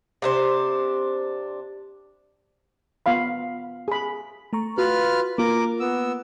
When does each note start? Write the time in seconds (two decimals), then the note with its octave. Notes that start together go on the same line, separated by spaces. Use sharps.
0.22 C3 D4 C5
3.06 B3 F4 F5 B5
3.88 G#4 B5
4.53 A3 A#5 C#6
4.78 F4 F#4 B4 F6
5.38 A#3 F4 A#4 D6
5.80 B3 E6